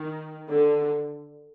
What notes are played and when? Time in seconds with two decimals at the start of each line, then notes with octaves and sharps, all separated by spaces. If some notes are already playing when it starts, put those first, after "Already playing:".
Already playing: D#3
0.50 D3